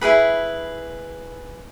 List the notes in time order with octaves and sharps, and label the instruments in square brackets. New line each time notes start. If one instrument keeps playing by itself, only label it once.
[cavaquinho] E4 F4 G#4 B4